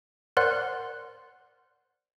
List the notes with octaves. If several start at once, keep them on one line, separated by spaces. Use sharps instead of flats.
A#4 C5 D5 F#5 C6 F#6